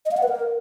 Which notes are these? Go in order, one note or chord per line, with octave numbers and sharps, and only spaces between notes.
D#5
F5
F#5
B4
A#4